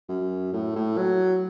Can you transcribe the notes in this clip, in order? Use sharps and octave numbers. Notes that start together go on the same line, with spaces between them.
F#2
A2
A2
F#3